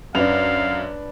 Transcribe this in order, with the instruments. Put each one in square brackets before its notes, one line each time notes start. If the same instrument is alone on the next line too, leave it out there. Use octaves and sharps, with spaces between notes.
[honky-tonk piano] F#2 [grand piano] D4 B4 F7 [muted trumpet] F5